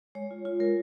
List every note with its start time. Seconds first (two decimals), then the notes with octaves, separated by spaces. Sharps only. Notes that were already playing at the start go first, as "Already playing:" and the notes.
0.15 G#3 C#5
0.31 F4
0.45 F4
0.60 G#3 A#4